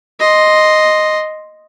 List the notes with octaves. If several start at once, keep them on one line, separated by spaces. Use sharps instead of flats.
D#5 C6